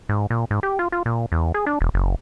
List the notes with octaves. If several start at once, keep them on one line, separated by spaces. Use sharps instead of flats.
G#2
A#2
G#2
G4
F4
F4
A#2
E2
G#4
D4
E1
F#1